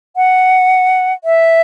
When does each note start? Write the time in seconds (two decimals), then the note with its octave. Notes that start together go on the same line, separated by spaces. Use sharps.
0.16 F#5
1.24 E5